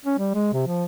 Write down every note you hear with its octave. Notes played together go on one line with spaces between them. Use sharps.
C#4
G3
G#3
C3
F3